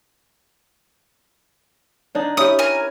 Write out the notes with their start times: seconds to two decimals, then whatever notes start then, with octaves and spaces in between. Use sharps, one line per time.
2.15 D3 D4 D#4
2.37 C#4 E4 G4 D#6
2.59 A#4 G#5